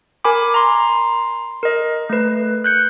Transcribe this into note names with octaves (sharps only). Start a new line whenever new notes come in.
A#4 G#5 B5 D6
A#5 C6
A#4 D#5
A3 B4
F#6 G6 C#7